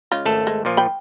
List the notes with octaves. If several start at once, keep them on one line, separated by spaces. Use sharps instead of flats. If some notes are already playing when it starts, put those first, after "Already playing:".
C#3 G#3 F4
G#1 A3 A4
G#3
A#2 F3
G5 B5